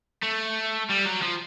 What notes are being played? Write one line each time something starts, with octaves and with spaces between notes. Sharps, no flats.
A3
G3
F#3
F3